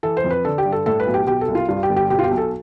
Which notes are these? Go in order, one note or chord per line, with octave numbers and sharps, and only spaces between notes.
E3 A4
C5
F2
B4
D3 A4
G4
G2
A4
A2 A4
B4
B1
G4
B2 G4
A4
C2
F4
G2 F4
G4
G1
G4
B2 G4
F4
G4
B1
A4